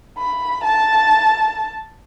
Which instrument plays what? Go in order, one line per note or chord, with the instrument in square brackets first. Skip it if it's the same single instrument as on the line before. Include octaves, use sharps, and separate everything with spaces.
[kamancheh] B5
A5